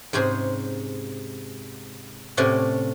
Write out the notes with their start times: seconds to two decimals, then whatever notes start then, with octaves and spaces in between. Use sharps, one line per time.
0.13 G#2 C3 C#4 G#4 C5
2.37 A2 C3 C#4 D5 F#5 C6